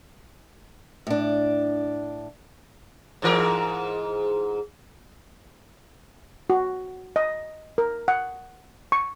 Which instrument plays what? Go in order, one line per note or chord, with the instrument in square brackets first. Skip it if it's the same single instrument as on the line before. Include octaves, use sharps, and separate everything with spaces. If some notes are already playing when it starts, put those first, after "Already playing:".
[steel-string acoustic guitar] A2 D4
[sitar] G#2 E3 A#4
[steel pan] F#4
D#5
A#4
F#5
C#6